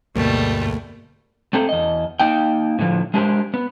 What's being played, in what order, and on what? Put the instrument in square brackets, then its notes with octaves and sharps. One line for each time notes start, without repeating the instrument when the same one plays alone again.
[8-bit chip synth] D2 [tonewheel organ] G2 [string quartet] B2 G3 A3 [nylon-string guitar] A#3 G#4
[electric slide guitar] A3 C4 A4
E2 D#5
A#3 D#4 G5
A2 D3 F3
G#3 D4 G4 A#4 C5
B3